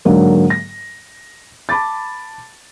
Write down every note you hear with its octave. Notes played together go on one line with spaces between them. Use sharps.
G#2 D3 F#3 A#3
A#6
A5 B5 D6 A6